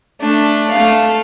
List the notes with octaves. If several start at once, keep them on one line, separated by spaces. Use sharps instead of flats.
A3 D4
A3 F5